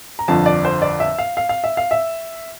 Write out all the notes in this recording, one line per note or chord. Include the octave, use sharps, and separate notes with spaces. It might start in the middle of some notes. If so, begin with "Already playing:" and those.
A#5
G1 F2 D3 F3 A5
D5
C5
D5
E5
F5
F5
F5
E5
F5
E5